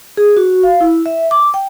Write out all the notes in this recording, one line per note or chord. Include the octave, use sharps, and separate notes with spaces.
G#4
F#4
F5
E4
E5
D6
G5